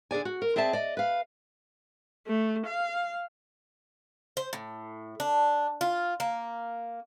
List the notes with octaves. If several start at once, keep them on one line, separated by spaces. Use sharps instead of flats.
D3 G#4 D5 G#5
F#4
A#4
C4 G#4 D5 E5 A5
D5 D#5
B4 F5
A3
F5
C5
A2
D4
F4
A#3